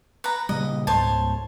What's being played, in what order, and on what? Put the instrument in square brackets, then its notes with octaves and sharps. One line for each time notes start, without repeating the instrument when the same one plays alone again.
[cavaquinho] B4 A#5
[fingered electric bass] A#2 C#3 G3 [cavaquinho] D#5
[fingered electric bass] C#2 G#2 [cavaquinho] C5 C#5 A5